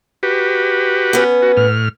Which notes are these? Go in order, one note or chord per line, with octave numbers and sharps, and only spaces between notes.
F#4 G4 B4
B3 C#4
F#4
A2 F6